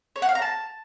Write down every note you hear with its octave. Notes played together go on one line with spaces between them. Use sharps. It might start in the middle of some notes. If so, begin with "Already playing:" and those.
C#5
F#5
F5
A#5
A5